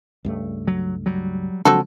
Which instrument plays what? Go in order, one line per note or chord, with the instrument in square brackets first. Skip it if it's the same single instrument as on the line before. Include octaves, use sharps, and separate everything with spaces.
[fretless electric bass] C#2 G2 A3
[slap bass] F#3
F#3 G3
[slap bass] C#3 F3 G#3 [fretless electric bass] F#3 D4 [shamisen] C4 F#4 A4